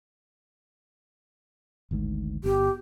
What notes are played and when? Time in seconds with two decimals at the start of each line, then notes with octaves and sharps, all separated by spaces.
1.91 G#1 D2 G#2
2.44 G1 B3 G4